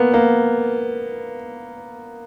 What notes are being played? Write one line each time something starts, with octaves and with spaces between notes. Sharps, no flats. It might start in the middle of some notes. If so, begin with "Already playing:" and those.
Already playing: A#3 B3
A#3